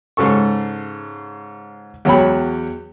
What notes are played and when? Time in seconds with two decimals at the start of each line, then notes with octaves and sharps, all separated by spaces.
0.17 G#2 C#3 A4 C#6
2.05 E2 F#3 C#5 G5 B5